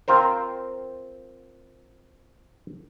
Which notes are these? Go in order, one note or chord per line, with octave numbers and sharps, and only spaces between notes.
C4 F4 A#4 C5